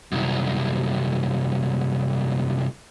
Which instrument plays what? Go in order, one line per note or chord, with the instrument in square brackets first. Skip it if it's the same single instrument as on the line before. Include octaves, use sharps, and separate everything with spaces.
[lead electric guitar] C2 F#2